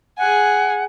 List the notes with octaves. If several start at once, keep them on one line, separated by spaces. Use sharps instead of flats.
G#4 F#5 G#5